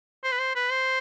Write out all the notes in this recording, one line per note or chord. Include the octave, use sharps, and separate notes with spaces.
C5
B4
C5
B4
C5